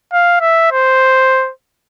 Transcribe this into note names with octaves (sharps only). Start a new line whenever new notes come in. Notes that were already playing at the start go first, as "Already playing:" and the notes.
F5
E5
C5